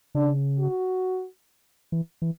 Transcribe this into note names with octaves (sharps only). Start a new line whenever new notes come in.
C#3 D4
F#4
E3
E3